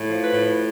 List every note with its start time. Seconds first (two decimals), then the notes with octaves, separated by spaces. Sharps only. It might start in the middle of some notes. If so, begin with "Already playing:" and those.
Already playing: A2
0.10 F3
0.22 B4
0.33 A2